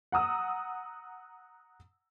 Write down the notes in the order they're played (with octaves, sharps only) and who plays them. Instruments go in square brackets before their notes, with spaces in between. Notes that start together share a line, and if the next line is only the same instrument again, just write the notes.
[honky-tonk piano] F#5 A#5 D#6 E6